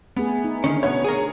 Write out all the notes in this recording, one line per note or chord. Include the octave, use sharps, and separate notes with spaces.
A3 B3 G#4
D#4
D3 D#3 C#4
B2 B3 C#5
G#4 A#4